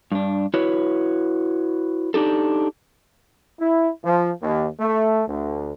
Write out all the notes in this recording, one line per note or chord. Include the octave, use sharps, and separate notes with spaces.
G2 D4
E4 F#4 B4 C#5
D4 D#4 G4 A4
E4
F3
D#2
A3
D2